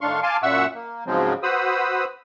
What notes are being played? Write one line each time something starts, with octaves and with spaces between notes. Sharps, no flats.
A2 D#3 D4 F5 C6 C#6
F5 G#5 A5 C6 D6
F#2 A#2 E5 F#5 C#6 E6
A#3
G#2 C#3 F3 F#3 G#3 C4
F#4 B4 C5 B5 D#6 E6